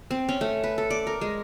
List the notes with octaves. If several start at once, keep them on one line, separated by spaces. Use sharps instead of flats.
C4
C#4
A3
B4
A4
D5
A#4
G#3